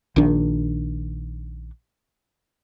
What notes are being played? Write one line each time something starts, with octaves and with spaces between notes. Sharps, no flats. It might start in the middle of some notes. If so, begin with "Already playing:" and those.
A#1 D#3 D4